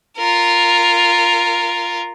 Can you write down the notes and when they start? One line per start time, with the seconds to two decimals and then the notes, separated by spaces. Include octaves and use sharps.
0.18 F4 A#4